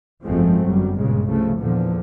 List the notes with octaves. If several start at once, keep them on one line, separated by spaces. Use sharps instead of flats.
G#1 F#2 F3 G#3 A3 C4
G1 F#2 F#3 G3
G2 A#2 C#3 G#3
C2 C#3 F3 A3
E2 A#2 D3 F3